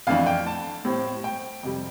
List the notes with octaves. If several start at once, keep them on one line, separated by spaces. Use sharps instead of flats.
F2 E3 A3 D4 F5
G5
A5
A2 G3 C4
G5
F2 C3 G3